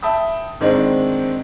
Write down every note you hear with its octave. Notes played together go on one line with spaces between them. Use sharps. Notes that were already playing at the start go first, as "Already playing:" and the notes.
E5 G5 A5 B5 D#6
G#2 D#3 G#3 C4 D4